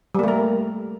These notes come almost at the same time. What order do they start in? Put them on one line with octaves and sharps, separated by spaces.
G3 A#3 A3 A#4